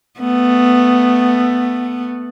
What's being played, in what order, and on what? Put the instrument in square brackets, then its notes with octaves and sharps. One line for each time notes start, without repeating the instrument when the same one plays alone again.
[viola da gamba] A3 B3